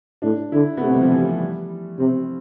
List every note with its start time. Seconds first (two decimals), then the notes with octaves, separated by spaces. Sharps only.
0.22 A2 D4
0.52 D3 E4
0.77 B3
0.81 C3 A3
0.94 G3
1.01 F3
1.12 E3
1.21 F3
1.40 G3
1.99 C3 C4